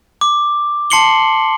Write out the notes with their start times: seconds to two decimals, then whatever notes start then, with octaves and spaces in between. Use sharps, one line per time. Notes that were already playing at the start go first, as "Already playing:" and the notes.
0.21 D6
0.90 A5 C6 C7 C#7 F#7 G7